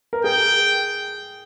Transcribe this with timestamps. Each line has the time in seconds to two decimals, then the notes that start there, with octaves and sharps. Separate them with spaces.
0.13 A#4
0.24 G#4 G5